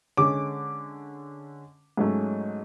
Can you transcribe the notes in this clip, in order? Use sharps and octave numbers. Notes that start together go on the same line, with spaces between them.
D3 G#3 C#4 D6
G#2 F#3 A3 C#4